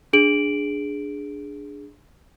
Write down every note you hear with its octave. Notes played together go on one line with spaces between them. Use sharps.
D4 G#4 D7 F#7